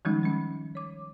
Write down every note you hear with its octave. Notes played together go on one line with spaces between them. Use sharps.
D#3 F3 G3 G#3 C#4 D#4
G#3 C#4
C#5 D6